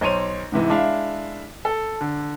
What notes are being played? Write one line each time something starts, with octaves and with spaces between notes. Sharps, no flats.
B1 C5 C#5 D#7 F7
G#2 C3 E3
G#3 D4 E4 E5 F5
A4
D3